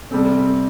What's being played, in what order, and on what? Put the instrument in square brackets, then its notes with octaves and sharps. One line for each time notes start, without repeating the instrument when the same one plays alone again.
[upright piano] C3 G3 C4 A4